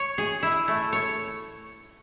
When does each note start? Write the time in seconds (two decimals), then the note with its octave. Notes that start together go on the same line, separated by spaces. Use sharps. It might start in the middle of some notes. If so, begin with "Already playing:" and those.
Already playing: C#5
0.18 G#4
0.43 E4
0.68 A3
0.93 C#5